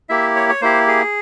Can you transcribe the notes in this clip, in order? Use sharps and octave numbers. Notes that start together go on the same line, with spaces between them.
A#3 E4 G4 E5
C#5
C#5
A#3 E4 G4 C5
G#4